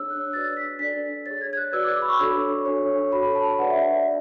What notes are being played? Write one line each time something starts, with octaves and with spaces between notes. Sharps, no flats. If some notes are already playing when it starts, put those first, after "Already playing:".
Already playing: D4 G#4 C#5 E6
F#6
D4 F#4 B4 D5 A6
B6
D4 A4 D5 B6
G#4 C#5 A6
G#6
G#6
F#6
F#4 B4 D5 E6
D6
D6
B5
C#6
D4 F#4 A4 C#5
D4 A4 C#5
F#4 A4 C#5 B5
A5
D4 G#4 B4 D5 F#5
E5
E5
D5
D4